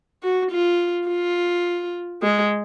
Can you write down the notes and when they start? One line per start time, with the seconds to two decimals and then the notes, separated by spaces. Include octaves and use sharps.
0.23 F#4
0.51 F4
1.08 F4
2.22 G#3